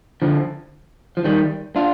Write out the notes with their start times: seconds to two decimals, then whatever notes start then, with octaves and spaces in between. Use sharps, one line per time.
0.22 D3 F3
1.17 F3
1.24 D#3 G3
1.76 D4 F4